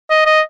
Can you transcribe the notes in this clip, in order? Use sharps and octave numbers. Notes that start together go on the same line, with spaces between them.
D#5
D#5